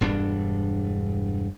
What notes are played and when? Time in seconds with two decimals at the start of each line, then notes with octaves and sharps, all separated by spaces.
0.01 E1 G2 D4